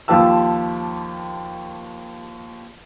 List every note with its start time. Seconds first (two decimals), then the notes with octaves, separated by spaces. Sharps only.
0.08 D#2 F3 F4 G4 A5 E6